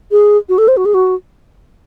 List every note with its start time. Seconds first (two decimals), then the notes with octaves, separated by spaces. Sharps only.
0.11 G#4
0.49 F#4
0.58 A4
0.68 C5
0.77 F#4
0.85 G#4
0.94 F#4